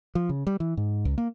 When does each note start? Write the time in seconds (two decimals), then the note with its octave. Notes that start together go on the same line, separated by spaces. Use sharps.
0.15 F3
0.29 C#3
0.47 G3
0.60 E3
0.77 G#2
1.05 C#2
1.18 A#3